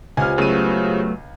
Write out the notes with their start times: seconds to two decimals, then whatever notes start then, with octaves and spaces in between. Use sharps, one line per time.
0.17 C#2 F4 G4 C5 G#5 F6
0.38 C#3 F#3 A3 B3 D#7